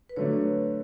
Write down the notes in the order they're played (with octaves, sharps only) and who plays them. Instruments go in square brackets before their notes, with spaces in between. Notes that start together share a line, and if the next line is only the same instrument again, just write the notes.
[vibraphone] B4
[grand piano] D3 F#3 A3 D4 [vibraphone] C#5